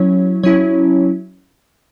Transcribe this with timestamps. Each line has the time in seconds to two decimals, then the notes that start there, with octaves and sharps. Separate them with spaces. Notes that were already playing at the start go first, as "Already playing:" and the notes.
Already playing: F#3 C#4 E4 C#5
0.43 F#3 C#4 E4 C#5